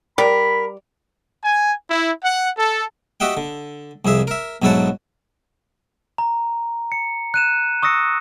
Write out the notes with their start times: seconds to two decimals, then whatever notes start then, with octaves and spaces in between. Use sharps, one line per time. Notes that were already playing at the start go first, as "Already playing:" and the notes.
0.18 G3 A#4 B5
1.43 G#5
1.90 E4
2.23 F#5
2.56 A4
3.20 F#4 G4 D#5 E5 F#5 G5
3.37 D3
4.05 C2 F2 G#4 E5
4.27 A#4 E5
4.62 B1 G#2 F#3 E4 F#5 A5
6.18 A#5
6.92 C#7
7.34 F#6 D#7 E7
7.83 C#6 D#6 E6 A#6 C#7